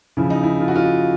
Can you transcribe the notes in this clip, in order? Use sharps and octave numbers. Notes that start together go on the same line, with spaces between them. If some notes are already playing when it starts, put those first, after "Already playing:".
C#3 F3 E4
D#4
E4
F4
F#4
F4